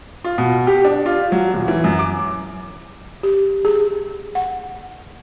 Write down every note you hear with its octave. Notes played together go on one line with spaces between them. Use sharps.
F4
B2
G4
D4
F4
F#3
D#1
E3
F#2
D6
G4
G#4
F#5